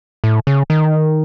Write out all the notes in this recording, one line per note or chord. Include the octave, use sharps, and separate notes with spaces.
A2
C#3
D#3